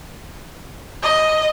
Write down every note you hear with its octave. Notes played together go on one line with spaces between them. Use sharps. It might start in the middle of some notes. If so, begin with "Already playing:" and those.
D#5